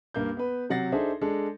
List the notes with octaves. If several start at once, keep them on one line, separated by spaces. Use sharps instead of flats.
G2 A#3 G6
B3 B4
C3 F#3 F#5 A6 A#6 C7
D4 D#4 G#4 A4 C5 E5
G#3 D4 A4